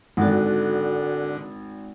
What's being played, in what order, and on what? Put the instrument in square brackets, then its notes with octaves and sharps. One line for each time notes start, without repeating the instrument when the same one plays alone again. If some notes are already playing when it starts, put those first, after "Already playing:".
[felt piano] G#1 [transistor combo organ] D3 [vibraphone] F#4 A4